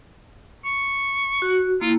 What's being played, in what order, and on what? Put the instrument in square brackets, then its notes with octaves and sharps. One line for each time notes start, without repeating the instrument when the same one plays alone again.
[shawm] C#6
[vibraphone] F#4
[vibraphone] A#3 E4 [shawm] F4